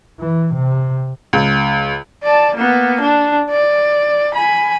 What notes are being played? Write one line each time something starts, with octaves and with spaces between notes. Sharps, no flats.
E3
C3
C#2
D5 A5
A#3 B3
D4
D5
G#5 B5